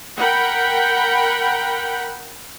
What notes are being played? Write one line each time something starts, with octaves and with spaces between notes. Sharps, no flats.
A#4 F#5 G5 B5